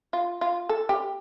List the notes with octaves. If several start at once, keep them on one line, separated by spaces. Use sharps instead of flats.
F4
F4
A4
G4